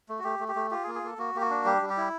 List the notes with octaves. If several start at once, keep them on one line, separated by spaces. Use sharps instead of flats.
A3
F#4
A3 G4
A3
G4
A3
F4 G4
G#4
A#3
G#4
A#3 A4
A#3 F#4
A#3 G4
F#4
D4
G3 G4
G3
G4
E4